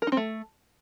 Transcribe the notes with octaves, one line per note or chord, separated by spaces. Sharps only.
A#4
D#4
C4
A3